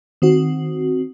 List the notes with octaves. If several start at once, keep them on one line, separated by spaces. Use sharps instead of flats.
D#3 C4 F#4